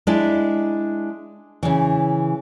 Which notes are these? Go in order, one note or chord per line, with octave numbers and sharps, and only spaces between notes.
G#3 D4 E4 E5
C#3 E3